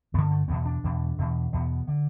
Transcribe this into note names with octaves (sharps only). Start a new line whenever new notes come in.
G2 D3 B3
A3
E2 B2 B3
D4
E2 B2
E2 B2
E2 B2 B3
D3